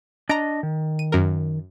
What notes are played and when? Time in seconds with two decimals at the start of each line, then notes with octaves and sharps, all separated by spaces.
0.29 D4 D#5 A#5 D7
0.63 D#3
0.99 D#7
1.12 F#2 A#4